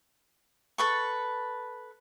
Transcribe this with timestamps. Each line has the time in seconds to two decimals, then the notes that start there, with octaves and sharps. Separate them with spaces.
0.78 A4 B4 C#6